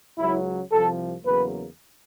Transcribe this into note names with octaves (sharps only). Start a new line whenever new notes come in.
C#2 C#3 F#3 E4
C2 C3 F3 A4
E2 C#3 F#3 A#3 B4